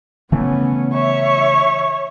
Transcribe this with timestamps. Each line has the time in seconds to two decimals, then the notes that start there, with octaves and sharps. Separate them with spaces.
0.32 C#3 E3 A3 B3 C#4
0.94 C#5 E5